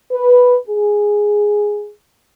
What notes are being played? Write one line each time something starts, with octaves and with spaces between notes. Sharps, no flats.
B4
G#4